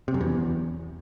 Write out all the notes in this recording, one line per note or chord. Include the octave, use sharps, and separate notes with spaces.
C3
F#2
E2